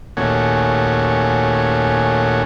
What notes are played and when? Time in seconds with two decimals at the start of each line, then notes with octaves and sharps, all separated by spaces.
0.17 D#2 A#2 A3 C#4 F#4 G#5